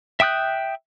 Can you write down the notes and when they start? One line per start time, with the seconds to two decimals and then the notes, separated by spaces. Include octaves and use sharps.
0.20 E5 G5 D#6 F#6 G6